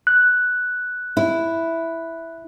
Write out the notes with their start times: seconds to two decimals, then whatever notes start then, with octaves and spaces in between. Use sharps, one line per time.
0.07 F#6
1.17 E4